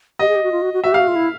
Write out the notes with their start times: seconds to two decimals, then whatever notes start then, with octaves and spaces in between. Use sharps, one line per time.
0.19 G4 D#5
0.28 G#4
0.36 G4
0.43 F#4
0.52 F4
0.62 F#4
0.73 F#4
0.84 F#4 E5
0.92 G4 F5
1.00 F#4
1.08 F4
1.15 E4